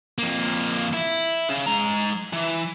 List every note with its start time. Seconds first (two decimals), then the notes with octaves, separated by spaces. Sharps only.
0.18 F2 A#3
0.93 E4
1.49 C#3
1.66 G#3 A#5
2.33 E3